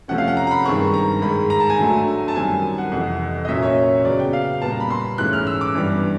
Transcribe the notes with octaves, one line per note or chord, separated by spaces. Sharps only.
C3 F3 A3 C#4 F#5
F5
F#5
A#5
A#5
B5
G2 D#3 G#3 C4 C#6
A#5
G#2 D#3 G#3 B5
A#5
A5
G#5
D3 F#3 A3
A5
F#2 D#3 G3 C4 G#5
F#5
F2 C3 E3 F#5
D#5
A#2 F#3 A#3 C#4 E5
C#5
C#3 F#3 B3 D5
G5
F5
A#2 G3 B3 A5
A#5
B5
C6
G#2 E3 A3 C#4 F#6
F6
E6
D6
G2 E3 G3 B3 D4